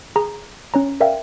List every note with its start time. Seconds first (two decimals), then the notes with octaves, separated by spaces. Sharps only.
0.16 G#4 A#5
0.74 C#4 C#5 A#5
1.00 A#4 D5 E5 F5 G5